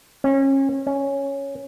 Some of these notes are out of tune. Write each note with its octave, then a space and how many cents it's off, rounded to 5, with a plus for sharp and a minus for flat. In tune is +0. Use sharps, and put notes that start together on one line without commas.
C#4 -30
C#4 +0